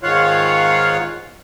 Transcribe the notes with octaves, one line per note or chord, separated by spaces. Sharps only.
G#2 D#3 F4 C#5 F5 F#5